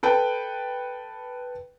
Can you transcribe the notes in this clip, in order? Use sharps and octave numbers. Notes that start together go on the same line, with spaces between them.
A4 B4 G5